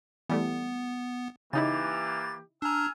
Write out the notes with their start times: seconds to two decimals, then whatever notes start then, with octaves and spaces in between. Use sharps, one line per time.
0.30 E3 G3 A3 B3
1.53 C#3 E3 A#3 D#4 E4 G4 A6
2.62 D4 G#5 A#5 E6 F6